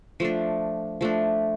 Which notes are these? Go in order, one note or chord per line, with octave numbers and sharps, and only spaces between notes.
F3 A3 D4
F3 A3 D4